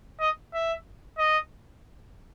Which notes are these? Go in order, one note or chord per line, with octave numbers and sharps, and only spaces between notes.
D#5
E5
D#5